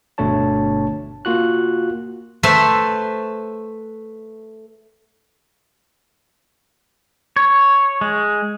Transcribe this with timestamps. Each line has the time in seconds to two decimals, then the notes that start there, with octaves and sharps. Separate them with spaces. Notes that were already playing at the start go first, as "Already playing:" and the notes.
0.18 G1 B2 A3 D4 C#5 A5
1.25 A#3 F4 F#4 F#6
2.43 A3 B4 C5 E5 A5 C6
7.36 C#5
8.01 G#3